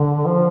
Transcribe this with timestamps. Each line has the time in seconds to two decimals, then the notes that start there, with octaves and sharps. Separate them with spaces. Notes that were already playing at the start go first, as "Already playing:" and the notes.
Already playing: D3
0.26 F3